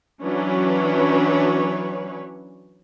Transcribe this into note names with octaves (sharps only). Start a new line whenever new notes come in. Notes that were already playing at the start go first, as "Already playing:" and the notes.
E3 F#3 C#4 D4 B4 C#5